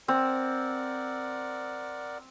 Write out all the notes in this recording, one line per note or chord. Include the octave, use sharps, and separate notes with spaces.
C4 A#4 D5 F#5